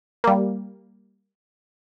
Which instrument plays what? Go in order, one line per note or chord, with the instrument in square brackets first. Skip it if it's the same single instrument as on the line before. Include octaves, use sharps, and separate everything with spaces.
[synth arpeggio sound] G3 A#3